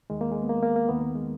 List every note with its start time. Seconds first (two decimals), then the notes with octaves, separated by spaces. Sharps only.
0.10 D#2 D#3 G#3
0.21 A#3
0.32 G#3
0.43 B3
0.49 A#3
0.62 A#3
0.76 A#3
0.89 D#2 D#3 B3
1.01 A#3
1.15 G#3